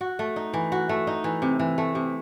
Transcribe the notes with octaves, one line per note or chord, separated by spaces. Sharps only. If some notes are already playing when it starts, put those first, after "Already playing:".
F#4
A3
D#4
E3
F#4
A3
D#4
E3
C3
E3
A3
C3